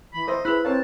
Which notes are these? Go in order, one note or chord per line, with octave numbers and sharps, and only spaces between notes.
E3 B5
A#4 C5 D#5 E5
E4 G#4 B4 B5 E6 F#6
C4 A#4 C#5 F5 A5